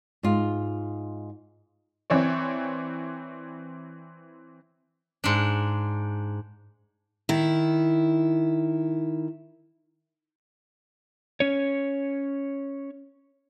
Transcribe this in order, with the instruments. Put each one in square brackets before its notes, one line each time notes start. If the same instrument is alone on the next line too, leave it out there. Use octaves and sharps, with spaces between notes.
[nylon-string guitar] G#2 F4
[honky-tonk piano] E3 C4 C#5 D5
[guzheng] G#2 D4
[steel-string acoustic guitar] D#3 E4
[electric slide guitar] C#4 C#5